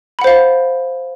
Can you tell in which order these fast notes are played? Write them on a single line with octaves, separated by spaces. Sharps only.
B5 F#5 C5 F5